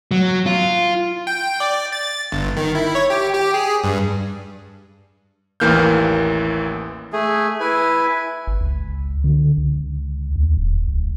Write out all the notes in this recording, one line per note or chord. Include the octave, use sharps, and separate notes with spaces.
F#3
F4
G5
D5
A6
G1
D#3
E4
C#5
G4
G4
G#4
G2
A1 D#2 E3 A#3 F6 G6
A3 G#4
E4 B4 G#5
G1
C#2
D3
C#2
D#2
D1
C#2